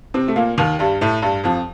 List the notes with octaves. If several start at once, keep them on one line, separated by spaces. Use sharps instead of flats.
C3 C4
A3
A#2 A#3
D#2 D#3
G2 G3
A2 A3
G2 G3
F2 F3